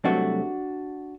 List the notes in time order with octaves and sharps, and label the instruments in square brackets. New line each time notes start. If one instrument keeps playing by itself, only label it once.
[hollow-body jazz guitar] C2 C3 F#3 A3 D4 F#4